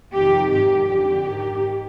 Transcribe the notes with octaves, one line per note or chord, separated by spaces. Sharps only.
F2 C3 D#3 G4
G#2 D#3 G4
F2 D3 G4
G#2 D#3